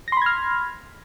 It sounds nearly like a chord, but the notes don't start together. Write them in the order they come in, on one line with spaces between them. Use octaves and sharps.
A#6 C6 B5 G#6 F6